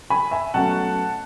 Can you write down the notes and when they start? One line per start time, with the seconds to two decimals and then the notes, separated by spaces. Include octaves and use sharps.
0.10 G#5 B5
0.31 E5 G#5
0.54 B2 F#3 A3 C#4 F#5 A5